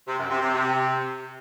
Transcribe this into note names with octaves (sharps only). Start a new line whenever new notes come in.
C3
F#2
C3
C3
C3